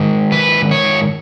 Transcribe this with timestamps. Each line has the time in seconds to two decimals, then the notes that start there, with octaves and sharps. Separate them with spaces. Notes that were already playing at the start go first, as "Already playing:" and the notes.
Already playing: G#2 D#3
0.32 B4
0.71 C#5